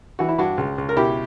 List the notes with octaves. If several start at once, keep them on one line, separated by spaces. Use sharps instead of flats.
E3 F#4
E4
G2 D4 F#4
C#2
C#2
A#4
B2 E4 G4